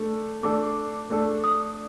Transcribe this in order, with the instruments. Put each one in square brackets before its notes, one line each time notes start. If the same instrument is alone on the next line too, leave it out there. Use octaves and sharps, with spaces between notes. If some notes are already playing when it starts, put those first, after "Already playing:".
Already playing: [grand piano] A3 D4 A4
[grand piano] A3 D4 A4 [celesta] D6
[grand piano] A3 D4 A4
[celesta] D#6